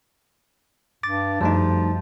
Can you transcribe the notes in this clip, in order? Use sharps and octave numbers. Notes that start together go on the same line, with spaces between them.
G2 D6 A6
F#2 F3 G3 A3 D#4